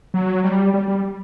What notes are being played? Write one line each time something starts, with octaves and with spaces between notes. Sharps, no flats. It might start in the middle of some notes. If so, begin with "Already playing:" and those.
F#3
G3
G3
G3